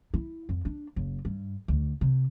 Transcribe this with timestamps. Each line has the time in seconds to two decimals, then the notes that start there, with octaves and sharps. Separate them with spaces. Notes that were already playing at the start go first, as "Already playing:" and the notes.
0.14 E4
0.49 F2
0.65 D4
0.96 F#1
1.25 G2
1.68 D2
2.01 C3